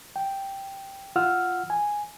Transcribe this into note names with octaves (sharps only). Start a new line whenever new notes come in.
G5
F4 F#5 E6 F6
G#5